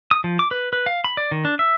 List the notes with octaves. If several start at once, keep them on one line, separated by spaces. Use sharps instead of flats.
D#6
F3
D6
B4
B4
F5
B5
D5
D#3
D4
E5